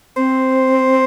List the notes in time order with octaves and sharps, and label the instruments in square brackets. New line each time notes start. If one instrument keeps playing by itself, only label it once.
[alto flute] C4 [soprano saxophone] C5